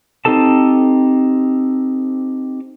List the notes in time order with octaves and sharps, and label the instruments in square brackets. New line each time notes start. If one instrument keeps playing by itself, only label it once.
[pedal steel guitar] C4 D#4 G4 A4 A5